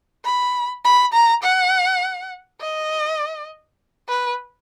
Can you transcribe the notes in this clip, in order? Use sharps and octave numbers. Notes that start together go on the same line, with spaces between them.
B5
B5
A#5
F#5
D#5
B4